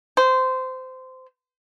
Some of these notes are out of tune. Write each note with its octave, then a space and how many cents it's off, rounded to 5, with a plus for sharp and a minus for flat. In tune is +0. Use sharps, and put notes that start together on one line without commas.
C5 -20